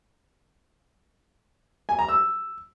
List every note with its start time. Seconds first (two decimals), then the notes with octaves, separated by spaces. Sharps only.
1.89 G#5
1.99 A#5
2.09 E6